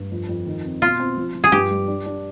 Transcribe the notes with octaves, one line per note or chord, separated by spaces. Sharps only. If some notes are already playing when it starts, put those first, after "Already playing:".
Already playing: G2
F2
F2
D#3
C4
B2 F4
C4
F3
F3
G#4
G2 G4
G3
D4
D4